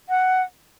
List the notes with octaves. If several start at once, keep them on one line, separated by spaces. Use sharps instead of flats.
F#5